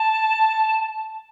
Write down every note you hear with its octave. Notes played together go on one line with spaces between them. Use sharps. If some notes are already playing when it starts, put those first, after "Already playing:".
Already playing: A5